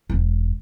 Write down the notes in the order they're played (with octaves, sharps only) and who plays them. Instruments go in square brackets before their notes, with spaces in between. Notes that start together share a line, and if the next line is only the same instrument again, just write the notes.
[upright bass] E1